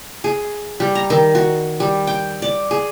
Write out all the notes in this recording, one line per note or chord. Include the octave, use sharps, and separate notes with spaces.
G#4
G3
A#5
D#3
F#4
G3
G5
D5
G#4